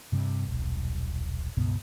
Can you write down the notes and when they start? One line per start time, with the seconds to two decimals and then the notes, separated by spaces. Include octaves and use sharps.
0.12 G2 C3 G3
0.47 D#1 B1
1.57 C#2 G2 B2 B3